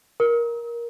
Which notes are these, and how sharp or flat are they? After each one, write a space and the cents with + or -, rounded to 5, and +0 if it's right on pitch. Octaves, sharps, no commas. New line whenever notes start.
A#4 +15